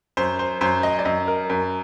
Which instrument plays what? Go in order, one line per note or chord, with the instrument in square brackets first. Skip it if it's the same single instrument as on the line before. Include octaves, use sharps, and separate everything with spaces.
[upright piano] F#2 [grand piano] C5
[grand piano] C5
[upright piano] F#2 [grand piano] C5
[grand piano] D#5
D5
[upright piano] F#2 [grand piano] D#5
[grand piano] A#4
[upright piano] F#2 [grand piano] A#4